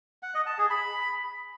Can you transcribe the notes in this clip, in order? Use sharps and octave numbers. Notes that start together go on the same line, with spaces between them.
F#5
D#5
A5
G#4
B5